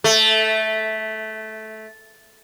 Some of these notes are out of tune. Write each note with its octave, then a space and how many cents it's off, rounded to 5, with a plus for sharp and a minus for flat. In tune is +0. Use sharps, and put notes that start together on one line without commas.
A3 -10